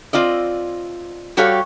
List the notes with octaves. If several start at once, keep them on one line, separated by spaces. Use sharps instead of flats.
C4 F4 D5 D#5
G3 F#4 G4 A4 C#5 F5